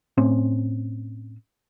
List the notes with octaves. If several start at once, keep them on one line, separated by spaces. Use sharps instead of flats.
A2 C4 C#4